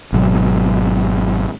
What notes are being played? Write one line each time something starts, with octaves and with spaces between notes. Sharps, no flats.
G#1 B2 F#3